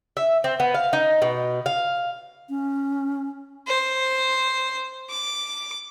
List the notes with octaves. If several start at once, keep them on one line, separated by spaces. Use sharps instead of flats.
E5
C4
B3
F5
D#4
B2
F5
C#4
C5
D6